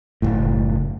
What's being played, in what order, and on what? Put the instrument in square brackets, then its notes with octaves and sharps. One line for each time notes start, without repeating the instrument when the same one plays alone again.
[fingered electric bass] F#1 A2